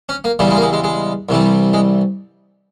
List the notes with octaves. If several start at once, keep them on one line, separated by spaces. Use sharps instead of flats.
C#4
A#3
E2 C#3 E3 G3
G#3
A#3
G#3
G#3
G#3
C2 C3 E3 G3
G#3